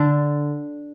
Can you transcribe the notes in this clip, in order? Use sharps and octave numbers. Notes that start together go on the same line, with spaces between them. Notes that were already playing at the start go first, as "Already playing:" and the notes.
Already playing: D3 D4